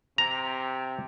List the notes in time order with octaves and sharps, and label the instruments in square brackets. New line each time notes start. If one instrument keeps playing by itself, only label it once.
[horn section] C3 [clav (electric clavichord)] A#5